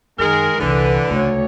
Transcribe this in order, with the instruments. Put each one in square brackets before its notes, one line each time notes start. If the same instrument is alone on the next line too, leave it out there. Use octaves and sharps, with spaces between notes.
[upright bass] F#2 [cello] D#3 G#4 [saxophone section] G#3 A#4
[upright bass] G1 C2 [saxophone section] D3 [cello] E3 B4
[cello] D2 C#5 [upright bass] C#3